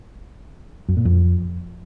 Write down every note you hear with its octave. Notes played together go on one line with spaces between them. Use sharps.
F#2
A#2
F2